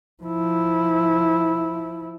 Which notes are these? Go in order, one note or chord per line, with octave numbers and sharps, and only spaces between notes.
F3 E4